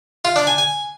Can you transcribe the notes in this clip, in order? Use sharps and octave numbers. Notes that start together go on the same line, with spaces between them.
F4
D4
G#5
G#5